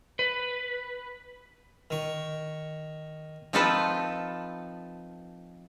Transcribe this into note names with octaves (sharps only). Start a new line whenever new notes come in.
B4
D#3 C#6
F3 C4 D#4 F4 A4 B4